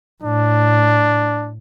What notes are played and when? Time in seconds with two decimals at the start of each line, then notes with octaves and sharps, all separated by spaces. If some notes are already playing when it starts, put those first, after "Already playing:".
0.23 A2 D4